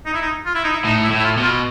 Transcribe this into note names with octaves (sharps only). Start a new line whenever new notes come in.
D#4
E4
D#4
F4
E4
D#4
E4
A2 D#4
E4
A2
E4
F4
B2
F4